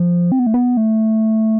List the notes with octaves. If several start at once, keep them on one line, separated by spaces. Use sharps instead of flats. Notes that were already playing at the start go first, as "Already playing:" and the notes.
Already playing: F3
C4
B3
A3
B3
A3